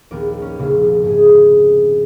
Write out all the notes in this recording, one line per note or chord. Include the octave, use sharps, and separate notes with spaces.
A#1 D#2 B3 A#4 D6
C#4
F1 A#1 C#3 C4
G#2 G#4